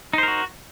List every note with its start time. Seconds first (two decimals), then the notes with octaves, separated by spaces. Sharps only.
0.13 D#4
0.18 C5
0.23 A#4
0.28 F#4